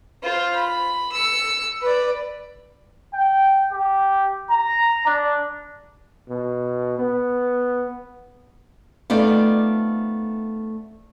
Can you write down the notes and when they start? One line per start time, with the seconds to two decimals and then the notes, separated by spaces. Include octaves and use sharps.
0.23 F4 C5
0.55 B5
1.12 E6 C#7
1.82 B4 D5
3.14 G5
3.72 G4
4.50 A#5
5.06 D4
6.29 B2
6.99 B3
9.10 A3 B3 C4 D#4 F4 D5